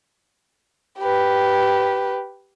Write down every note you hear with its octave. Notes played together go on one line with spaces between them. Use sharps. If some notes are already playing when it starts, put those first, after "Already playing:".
G4 B4